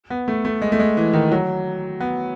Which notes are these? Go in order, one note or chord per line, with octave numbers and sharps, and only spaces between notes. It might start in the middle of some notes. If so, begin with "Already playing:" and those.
B3
A3
A3
G#3
A3
G#3
E3
D#3
F#3
B3